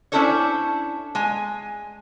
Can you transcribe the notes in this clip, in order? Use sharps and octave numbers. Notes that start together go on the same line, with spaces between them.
C#4 D4 E4 A4 C5 C#5
G#3 G#5